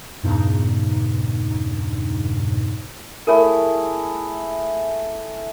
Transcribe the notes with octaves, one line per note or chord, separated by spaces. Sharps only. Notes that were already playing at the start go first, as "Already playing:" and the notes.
E2 G2 A#2 C#3 D#4
A3 E4 G#4 A#4 C#5